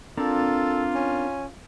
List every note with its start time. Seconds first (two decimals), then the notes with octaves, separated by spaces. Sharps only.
0.17 C4 D4 F4 A4 A#4
0.94 C#4